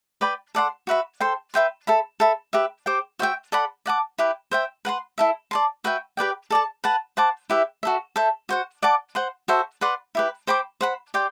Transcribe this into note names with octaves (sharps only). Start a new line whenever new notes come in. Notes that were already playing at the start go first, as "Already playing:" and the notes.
B4 D5 G5 B5
A4 D5 F#5 C6
F#4 B4 E5 B5
A4 C5 G5 C6
B4 E5 G5 C6
A4 E5 B5
A4 E5 B5
G4 B4 E5
G4 C5 G5 D6
F#4 C5 E5 G5
A4 D5 F#5 B5
D5 F#5 A5 D6
E4 G4 B4
C5 E5 G5
B4 F#5 A5 C6
E4 A4 E5
D5 A5 C6
F#4 B4 E5 G5
G4 B4 D5 G5
A4 D5 A5
B4 F#5 A5
C5 F#5 A5 D6
E4 G4 B4 E5
F#4 A4 E5
A4 C5 E5
F#4 C5 F#5
D5 F#5 A5 D6
C5 F#5 C6
F#4 A4 C5 E5
B4 D5 F#5 C6
E4 G4 B4
C5 G5 B5 D6
C5 F#5 B5
G4 D5 G5 C6